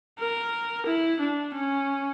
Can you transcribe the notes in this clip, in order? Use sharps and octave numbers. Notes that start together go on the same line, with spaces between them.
A#4
E4
D4
C#4